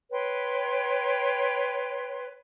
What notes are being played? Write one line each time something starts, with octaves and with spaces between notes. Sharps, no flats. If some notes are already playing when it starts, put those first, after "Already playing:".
B4 C#5 G5 C6